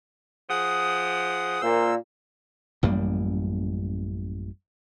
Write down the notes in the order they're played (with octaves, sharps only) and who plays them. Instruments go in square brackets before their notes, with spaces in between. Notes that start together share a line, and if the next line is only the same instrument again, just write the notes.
[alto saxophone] F3 [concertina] G#4 F#5 D#6
[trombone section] A#2 [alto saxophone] C5 [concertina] E6
[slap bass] A1 F#2 G3 A#3